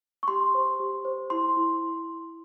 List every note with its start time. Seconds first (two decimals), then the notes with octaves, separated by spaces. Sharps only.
0.23 C#6
0.28 G4 C6
0.55 C5
0.80 G4
1.05 C5
1.30 E4 C6
1.57 E4